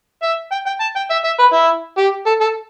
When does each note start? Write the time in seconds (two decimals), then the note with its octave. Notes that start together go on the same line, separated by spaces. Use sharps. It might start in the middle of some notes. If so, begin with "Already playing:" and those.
0.23 E5
0.52 G5
0.66 G5
0.81 A5
0.96 G5
1.10 E5
1.24 E5
1.39 B4
1.54 E4
1.98 G4
2.26 A4
2.41 A4